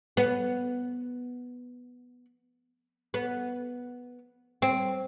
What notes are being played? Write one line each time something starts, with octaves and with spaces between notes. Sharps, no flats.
B3
B3
C4